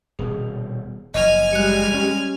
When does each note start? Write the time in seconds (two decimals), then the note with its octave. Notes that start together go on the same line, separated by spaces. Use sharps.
0.19 D#1 B2 G3 G#4
1.14 F#1 F3 D#5 G#5 F6
1.53 G3 G#3 F#6 C#7
1.94 C#4